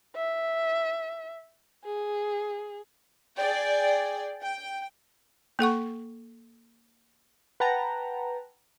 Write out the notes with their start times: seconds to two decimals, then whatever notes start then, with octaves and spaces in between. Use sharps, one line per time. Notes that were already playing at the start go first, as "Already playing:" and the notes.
0.16 E5
1.85 G#4
3.37 G#4 D5 G5
4.42 G5
5.59 A#3 A4 F#5 C#6
7.60 B4 F#5 G5 A5 A#5